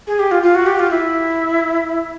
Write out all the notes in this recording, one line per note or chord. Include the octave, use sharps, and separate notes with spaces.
G#4
G4
F4
F4
F#4
G4
F4
E4